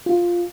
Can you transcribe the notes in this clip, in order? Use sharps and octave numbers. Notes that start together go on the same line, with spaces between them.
F4